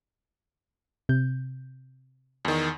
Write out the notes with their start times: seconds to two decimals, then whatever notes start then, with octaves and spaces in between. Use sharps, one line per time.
1.09 C3 G6
2.45 E2 D#3